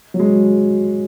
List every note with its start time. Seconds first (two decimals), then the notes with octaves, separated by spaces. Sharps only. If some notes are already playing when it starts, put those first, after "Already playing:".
0.14 F#3
0.19 G#3